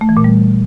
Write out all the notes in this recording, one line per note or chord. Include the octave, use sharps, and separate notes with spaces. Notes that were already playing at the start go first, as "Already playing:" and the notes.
A3
E3
A#2
G3